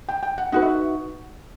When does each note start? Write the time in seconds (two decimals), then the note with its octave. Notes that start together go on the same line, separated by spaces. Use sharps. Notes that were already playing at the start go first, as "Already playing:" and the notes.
0.09 G5
0.23 G5
0.38 F#5
0.52 D#4 F#4 B4 F#5
0.62 E5